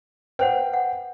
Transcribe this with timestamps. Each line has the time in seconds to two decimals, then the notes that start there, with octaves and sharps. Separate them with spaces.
0.39 B4 C5 F#5 G5
0.74 F#5